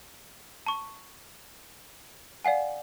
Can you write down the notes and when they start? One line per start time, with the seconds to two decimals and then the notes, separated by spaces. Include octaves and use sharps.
0.66 A5 C#6
2.45 D5 F5 F#5 G#5